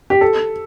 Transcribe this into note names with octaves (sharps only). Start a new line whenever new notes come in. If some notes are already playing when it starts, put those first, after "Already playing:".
G4
A4